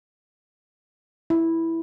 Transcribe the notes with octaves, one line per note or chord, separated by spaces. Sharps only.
E4